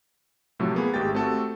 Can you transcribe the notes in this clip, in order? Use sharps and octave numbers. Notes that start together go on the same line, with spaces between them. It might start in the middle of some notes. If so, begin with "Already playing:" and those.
A2 C3 F3 F#3 A3
A#3 B3 G#4
G#1 G#3 A3 G4 G5 A6
A3 C4 F#4 G4 A4